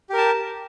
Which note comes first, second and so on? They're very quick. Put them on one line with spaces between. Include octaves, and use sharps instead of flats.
G4 A#4 A5